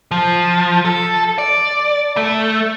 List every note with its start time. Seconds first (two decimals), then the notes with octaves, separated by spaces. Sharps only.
0.11 F3
0.85 A4
1.38 D5
2.17 A3